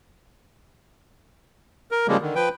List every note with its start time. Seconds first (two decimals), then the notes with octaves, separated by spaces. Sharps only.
1.91 A#4
2.08 C#3 F3 G3 G#3 A#3
2.21 D3 D#3
2.35 F3 B4 G5